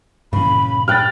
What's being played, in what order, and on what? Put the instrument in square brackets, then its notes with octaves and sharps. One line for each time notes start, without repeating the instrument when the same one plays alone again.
[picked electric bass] G2 A#2 E3 [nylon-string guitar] C#3 [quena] B5
[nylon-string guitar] B4 G5 [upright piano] F6 F#6 A6